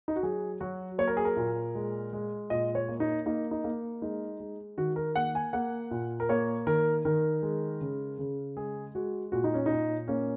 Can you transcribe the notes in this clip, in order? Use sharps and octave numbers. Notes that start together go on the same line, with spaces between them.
D#4
F#4
F#3 G#4
F#3 F#4
A#3 C#5
A#4
G#4
A#4
A#2
G#3
G#3
A#2 D#5
C#5
A#3
D#4
A#3 D#4
D#4
A#3
G#3 D#4
G#3
D#3 F#4
A#4
A#3 F#5
G#5
A#3 F#5
A#2
A#4
A#3 C#5
D#3 A#4
D#3 A#4
G#3
C#3
C#3
G#3 G#4
G#3 F#4
A#2 F#4
D#4
C#4
A#2 D#4
A#3 C#4